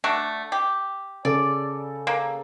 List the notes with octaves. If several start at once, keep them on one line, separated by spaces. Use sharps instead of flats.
A3 D4 F#4
G4
C#3 A4 D5
A#3